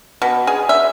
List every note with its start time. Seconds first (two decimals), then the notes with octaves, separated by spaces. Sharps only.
0.22 B2
0.47 G#4
0.69 E5